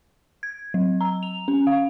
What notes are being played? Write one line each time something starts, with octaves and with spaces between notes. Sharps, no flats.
G#6
F#3
A#5
F7
C#4
F5